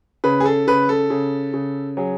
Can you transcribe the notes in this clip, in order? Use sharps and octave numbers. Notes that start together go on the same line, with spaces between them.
C#3 B4
G#4
A4
C#3 B4
A4
C#3
C#3
F#3 G#4